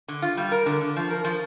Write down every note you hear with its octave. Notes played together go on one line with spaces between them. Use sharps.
D3
F4
G3
A#4
D3
D3
F3
A#4
F3